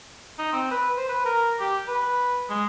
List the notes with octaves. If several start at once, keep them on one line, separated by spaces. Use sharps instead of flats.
D#4
C4
B4
C5
B4
A#4
G4
B4
G#3